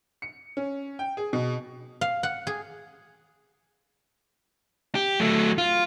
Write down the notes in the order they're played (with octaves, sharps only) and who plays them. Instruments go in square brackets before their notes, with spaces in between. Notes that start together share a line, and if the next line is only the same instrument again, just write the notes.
[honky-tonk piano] C#7
C#4
G5
G#4
B2
[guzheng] F5
F#5
G#4
[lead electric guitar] G4
F#3 A3
F4